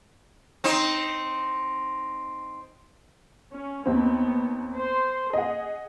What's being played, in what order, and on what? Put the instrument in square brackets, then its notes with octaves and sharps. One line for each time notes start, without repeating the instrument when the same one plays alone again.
[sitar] C4 D#4
[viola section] C#4
[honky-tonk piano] D#2 C4 [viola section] B3
[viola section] C5
[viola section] G#4 [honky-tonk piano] D#5 F#5